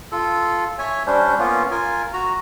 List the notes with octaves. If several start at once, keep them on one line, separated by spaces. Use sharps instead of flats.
F4 A4
C#5 E5 G#5
G3 C#4 D4 C5
A#3 B3 C#4 F4
F4 A#4 G#5
F#4 A#5